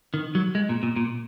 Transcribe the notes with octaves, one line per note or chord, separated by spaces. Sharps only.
D#3
F#3
G#3
A#2
A#2
A#2